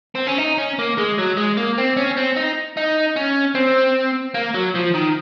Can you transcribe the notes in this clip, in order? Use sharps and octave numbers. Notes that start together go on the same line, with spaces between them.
C4
C#4
D#4
C#4
A#3
G#3
F#3
G#3
A#3
C4
C#4
C4
D#4
D#4
C#4
C4
A#3
F#3
F3
D#3